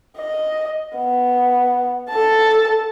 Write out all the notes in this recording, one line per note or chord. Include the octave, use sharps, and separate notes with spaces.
D#5
B3
A4 A5